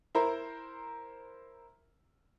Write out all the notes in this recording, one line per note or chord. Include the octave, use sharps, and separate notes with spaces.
E4 A#4 C5 A#5